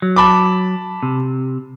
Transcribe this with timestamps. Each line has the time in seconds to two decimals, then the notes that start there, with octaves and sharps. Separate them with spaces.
0.02 F#3
0.16 A5 B5 D6
1.03 C3